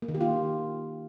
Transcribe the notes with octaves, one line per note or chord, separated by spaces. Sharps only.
A#3
D#3
G4
F4